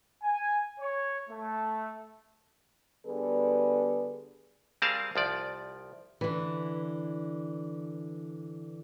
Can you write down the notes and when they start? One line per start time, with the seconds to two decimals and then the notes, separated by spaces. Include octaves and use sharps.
0.23 G#5
0.80 C#5
1.30 A3
3.07 D3 G3 B3 G#4 B4
4.82 G3 C4 G#4 A#4 F5 A5
5.16 C2 F3 D5
6.21 D3 E3